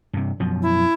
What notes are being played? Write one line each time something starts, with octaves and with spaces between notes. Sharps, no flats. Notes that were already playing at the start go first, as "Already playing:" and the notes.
G2 C3
F#2 B2 F3
E4